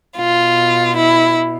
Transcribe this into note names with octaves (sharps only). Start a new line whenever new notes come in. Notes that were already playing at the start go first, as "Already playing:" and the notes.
B2 F4
E4